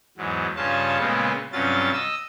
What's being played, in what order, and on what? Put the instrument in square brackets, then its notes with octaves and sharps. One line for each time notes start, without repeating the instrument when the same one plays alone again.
[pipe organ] E2 G#2 F#3
G2 C#3 C#4 F4 A5
A#2 C#3 G#3 B3 C4
G2 C3 F#3 C#4 F4 A6
D#5 E6